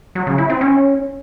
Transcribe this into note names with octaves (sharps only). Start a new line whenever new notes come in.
F#3
C#3
E4
C4
C#4